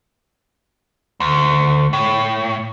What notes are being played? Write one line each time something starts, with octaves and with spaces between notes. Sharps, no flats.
D2
A2